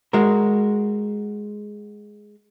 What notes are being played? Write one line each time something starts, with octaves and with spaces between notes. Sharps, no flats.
G#3 F#4 A#4